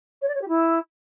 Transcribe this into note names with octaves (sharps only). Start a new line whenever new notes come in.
C#5
D5
C#5
G4
E4